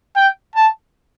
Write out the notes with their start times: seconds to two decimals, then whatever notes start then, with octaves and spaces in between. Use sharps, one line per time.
0.16 G5
0.55 A5